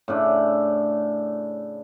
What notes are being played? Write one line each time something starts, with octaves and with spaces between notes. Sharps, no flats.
A2 C#3 D4